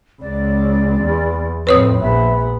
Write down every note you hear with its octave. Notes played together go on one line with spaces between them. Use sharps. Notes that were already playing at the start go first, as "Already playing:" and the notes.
C#2 D5
E2
F2 A2 B4 C#5 D#6
A#1 B3 E5